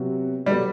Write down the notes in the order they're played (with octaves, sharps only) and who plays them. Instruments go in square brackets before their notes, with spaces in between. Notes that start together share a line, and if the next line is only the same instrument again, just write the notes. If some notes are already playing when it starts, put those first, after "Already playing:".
Already playing: [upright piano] C3 F#3 B3 F#4
[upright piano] B2 F#3 B3 F#4 A4 [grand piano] G3